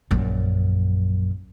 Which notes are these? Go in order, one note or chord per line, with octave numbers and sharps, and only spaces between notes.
A#1 F#2